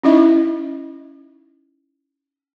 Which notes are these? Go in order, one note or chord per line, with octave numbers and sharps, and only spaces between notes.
C#4 D#4 E4 D#5 E5